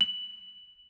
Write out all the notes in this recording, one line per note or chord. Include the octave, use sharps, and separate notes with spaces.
F#7